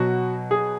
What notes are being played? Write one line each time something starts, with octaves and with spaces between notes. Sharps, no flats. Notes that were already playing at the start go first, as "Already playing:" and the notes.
Already playing: B2 F#3 F#4
G#4